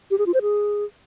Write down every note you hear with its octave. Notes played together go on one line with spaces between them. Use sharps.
G4
G#4
F4
C5
G#4